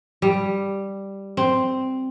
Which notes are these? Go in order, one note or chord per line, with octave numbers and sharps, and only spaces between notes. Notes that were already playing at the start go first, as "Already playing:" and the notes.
G3
C4